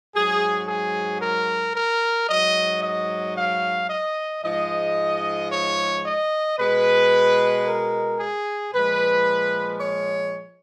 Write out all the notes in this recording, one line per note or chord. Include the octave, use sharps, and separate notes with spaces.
G#2 F#3 G#4
G#4
A#4
A#4
G#2 F#3 D#5
D#5
F5
D#5
G#2 F3 G#3 D#5
C#5
D#5
B2 G#3 B4
A#4
G#4
A#2 F3 G#3 B4
C#5